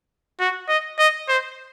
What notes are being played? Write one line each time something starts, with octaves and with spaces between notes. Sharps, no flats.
F#4
D#5
D#5
C5